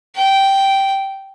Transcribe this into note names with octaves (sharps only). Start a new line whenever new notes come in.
G5